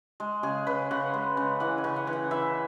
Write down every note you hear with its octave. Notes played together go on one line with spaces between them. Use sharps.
G#3
C#3 G#4
C#3 B4
C#3 F#5
G#3
C#3
E3 F#5
G#5
C#3
F#5
E3
F#5
E3 E5